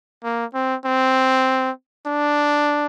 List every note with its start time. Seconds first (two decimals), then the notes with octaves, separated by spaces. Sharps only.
0.24 A#3
0.54 C4
0.85 C4
2.07 D4